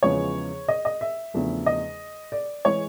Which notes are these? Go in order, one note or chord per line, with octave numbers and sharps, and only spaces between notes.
E2 C#3 F3 G#3 B3 C#5
D#5
D#5
E5
E2 C#3 F3 A3 D4
D#5
D5
E3 G#3 C#5